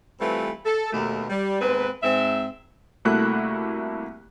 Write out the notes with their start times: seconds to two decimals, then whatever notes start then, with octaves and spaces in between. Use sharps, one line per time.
0.20 E3 G3 A3 C4 F4 B4
0.66 A4
0.92 D#2 B2 A3
1.29 G3
1.61 D#2 G#2 B3 C4 B4
2.02 G#2 C4 E5
3.05 C2 A3 A#3 E4 F#4 F#6